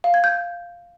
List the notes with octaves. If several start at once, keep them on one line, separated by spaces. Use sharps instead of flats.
F5
G#6
G6